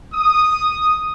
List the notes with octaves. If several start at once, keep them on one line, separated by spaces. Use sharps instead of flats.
D#6